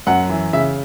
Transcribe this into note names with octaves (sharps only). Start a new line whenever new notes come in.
F#2 F#5
E3
C#3 E5